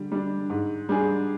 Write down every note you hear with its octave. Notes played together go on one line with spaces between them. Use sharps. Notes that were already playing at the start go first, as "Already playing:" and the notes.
Already playing: D3 G3
G3 D4
G#2
G3 D4 G#4